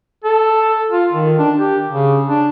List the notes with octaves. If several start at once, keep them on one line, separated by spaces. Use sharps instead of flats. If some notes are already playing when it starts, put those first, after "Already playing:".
A4
F4
D#3
D4
G4
C#3
D4